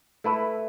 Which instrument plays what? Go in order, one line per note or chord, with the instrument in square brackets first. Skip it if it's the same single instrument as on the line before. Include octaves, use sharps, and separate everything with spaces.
[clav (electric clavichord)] A3 E4 B4 E5